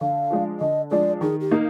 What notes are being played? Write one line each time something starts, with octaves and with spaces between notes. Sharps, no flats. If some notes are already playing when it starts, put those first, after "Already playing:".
D3 F5
F3 G#3 D4
D3 D#5
F3 G#3 D4 D5
D#3 G#4
G4
A#3 D#4